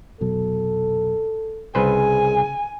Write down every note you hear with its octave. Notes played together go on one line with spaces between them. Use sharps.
F1 B2 F#3 A4
C2 C#3 G#4 B4 C5 G#5